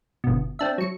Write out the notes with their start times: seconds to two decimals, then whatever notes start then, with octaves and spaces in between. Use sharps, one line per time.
0.24 G1 B2
0.59 C4 D4 E5
0.78 F#3 C#7